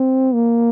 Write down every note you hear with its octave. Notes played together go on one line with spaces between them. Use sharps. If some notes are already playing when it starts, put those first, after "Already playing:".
Already playing: C4
A#3